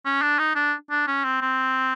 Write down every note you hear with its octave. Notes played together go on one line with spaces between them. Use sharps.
C#4
D4
D#4
D4
D4
C#4
C4
C4